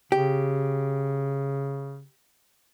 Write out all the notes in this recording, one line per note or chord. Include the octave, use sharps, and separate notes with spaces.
C#3 G4